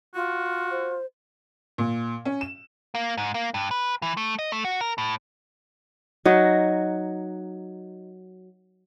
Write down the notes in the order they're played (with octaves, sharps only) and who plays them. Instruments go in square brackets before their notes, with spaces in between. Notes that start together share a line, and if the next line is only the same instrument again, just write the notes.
[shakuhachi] F4 [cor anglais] F#4
[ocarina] C5
[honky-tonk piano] A#2
C#4
E7
[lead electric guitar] A#3
G#2
A#3
G2
B4
E3
A3
D#5
A3
F#4
A#4
A2
[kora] F#3 D#4 F#4 D#5